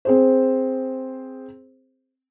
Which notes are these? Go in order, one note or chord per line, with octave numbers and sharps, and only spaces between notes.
C4 G#4 C5